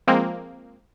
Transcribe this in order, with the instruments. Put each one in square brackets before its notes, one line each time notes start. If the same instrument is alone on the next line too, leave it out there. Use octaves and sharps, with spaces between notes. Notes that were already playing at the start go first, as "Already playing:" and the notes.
[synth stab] F3 G#3 A#3 C4